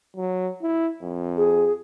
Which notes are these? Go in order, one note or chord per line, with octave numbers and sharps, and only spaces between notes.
F#3
E4
F2
G#4